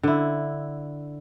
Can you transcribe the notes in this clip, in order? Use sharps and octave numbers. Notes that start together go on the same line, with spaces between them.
D3 E4